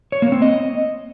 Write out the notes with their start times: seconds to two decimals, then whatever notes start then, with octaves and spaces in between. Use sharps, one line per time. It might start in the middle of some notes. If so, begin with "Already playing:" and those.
0.12 C#5
0.22 A#3
0.32 C4
0.42 D#5